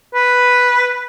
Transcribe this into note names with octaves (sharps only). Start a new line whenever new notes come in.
B4